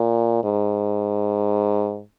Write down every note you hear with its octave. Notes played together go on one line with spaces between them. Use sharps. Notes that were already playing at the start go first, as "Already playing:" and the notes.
Already playing: A#2
G#2